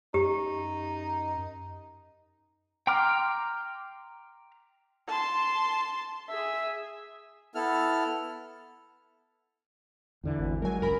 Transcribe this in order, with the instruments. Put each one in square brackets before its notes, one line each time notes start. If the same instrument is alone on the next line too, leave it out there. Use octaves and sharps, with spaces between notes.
[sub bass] F#2 [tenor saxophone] D#4 [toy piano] G4
[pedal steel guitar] G5 A#5 C6 D6 F6
[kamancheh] A5 C6
G#4 E5
[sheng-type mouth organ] B3 E4 A4 F6
[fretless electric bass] E2 D3 E3
[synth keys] G#1
[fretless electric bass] F#3 G#3 [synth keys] A#4 G#5
[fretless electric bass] C#2 F#2 [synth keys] A#4 B5